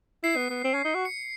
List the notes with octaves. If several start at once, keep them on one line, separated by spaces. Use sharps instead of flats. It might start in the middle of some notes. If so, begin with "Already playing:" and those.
E4 C7
B3
B3
C4
C#4
D#4
F#4
C#7